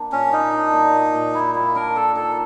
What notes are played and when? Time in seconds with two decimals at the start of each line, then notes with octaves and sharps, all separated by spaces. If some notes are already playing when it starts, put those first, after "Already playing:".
Already playing: A#3 D4
0.12 A#2 C#4
0.32 A#3 D#4
0.53 D4
0.73 A#2
0.94 A#2
1.15 A#2
1.34 A#3 E4
1.55 A#2 E4
1.75 D4 A#4
1.96 D4 A4
2.15 D#4 A4